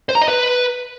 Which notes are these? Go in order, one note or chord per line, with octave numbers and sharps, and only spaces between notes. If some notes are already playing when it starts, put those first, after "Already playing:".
C5
A#5
D#5
B4